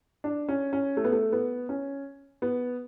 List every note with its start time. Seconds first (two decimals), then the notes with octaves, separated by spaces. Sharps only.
0.24 D4
0.49 C#4
0.73 C#4
0.97 A3
1.04 B3
1.12 A3
1.32 B3
1.69 C#4
2.42 B3